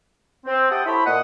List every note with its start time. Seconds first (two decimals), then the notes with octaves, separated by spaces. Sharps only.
0.46 C4
0.70 G4 E5 F#5 G5 A5 D#6
0.85 E4 A4 C5 C#5 B5
1.05 A#2 D#5 F#5